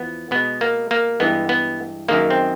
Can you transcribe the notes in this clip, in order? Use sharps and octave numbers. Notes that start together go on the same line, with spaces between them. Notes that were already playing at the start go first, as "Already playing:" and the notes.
Already playing: E2 F3 B3
B2 G#3 B3
A#3
A#3
G2 E3 G#3 B3
B3
F#2 D#3 G#3 A#3
C4